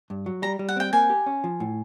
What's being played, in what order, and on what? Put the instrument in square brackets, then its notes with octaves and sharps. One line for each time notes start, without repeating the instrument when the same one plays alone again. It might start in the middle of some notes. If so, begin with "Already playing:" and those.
[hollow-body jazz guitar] G2
F#3
[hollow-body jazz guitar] G3 [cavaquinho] A#5
[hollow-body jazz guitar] G3
[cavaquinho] F#5
[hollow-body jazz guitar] C4 [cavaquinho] G5
[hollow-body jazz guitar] A#3 [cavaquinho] G#5
[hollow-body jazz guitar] G4
C#4
F3
A2